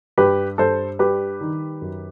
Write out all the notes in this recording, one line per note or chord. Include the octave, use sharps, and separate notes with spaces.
G2 G4 B4
G2 A4 C5
G3 G4 B4
D#3
F#2